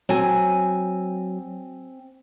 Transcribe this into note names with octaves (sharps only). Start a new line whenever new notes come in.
F#3 C4 G#5